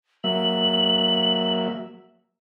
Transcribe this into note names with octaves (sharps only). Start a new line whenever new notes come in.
F#3 A#3 E5 F#7